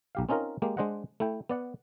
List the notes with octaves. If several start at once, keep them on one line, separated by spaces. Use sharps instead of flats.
B1 G4 F5
C4 C#4 D#4 F4 A#4
G#3 A#3 G4
G#3 D4 C5 D#5 F#5
A3 E4 G5
B3 D5 F#5